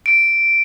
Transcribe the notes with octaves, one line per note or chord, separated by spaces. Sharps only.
D7